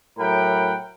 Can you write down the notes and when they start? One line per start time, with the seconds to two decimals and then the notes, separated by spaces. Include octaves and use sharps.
0.18 A2 F#3 A#4 F#5 G5 B5